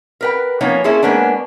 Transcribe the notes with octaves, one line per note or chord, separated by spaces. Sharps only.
A#4 B4 G5
F3 A#3 B3 C#4 D#4 C#5
A#3 C#4 E4 G#4 A4 C5
G#3 A#3 B3 C#4 D4